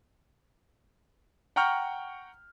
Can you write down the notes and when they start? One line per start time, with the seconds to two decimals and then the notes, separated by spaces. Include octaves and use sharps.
1.56 F#5 G5 A#5 C#6 F6 G6